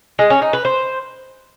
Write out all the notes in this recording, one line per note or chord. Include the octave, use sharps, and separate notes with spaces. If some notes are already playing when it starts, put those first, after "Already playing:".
G#3
C#4
D#4
B4
C5